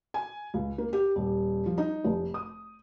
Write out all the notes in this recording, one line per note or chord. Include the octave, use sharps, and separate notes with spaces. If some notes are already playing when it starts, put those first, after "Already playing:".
G#5
C#2
A#3
G4
D#1
F3
D#4
F1
D#6